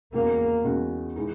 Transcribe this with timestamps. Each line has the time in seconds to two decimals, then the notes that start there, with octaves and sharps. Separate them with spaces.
0.14 E2 C#3 G#3 A#3 C#4 F#4
0.64 E2 C#3 G#3 C#4 F#4
1.16 E3 G#3 D#4